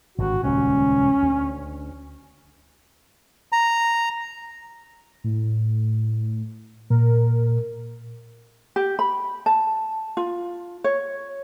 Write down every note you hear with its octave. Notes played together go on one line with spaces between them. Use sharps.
G#1 G2 D3 F#4
D#1 C#2 A#2 C#4
D2
A#5
A2
A#2 A#4
G4
B5
A5
F4
C#5